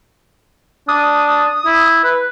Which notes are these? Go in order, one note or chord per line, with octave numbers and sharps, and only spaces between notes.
D4 D#6
E4
B4